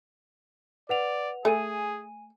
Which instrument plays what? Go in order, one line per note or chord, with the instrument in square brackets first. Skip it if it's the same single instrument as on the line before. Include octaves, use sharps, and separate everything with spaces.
[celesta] B4 F#5 F7 [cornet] D5
[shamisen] A3 [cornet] G#4 [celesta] G#5 D#7